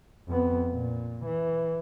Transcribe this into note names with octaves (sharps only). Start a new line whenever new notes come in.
F2 B3
A#2
E3